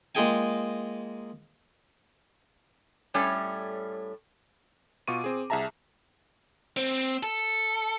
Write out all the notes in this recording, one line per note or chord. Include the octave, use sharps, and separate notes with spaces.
G#3 A#3 F4 G#4 G5 G#5
A2 G3 A3 C#4 A4 C#5
B2 F4 C#6 D6 D#7
C4 G#4
C2 G#4 E5 A5 A#5
C4
A4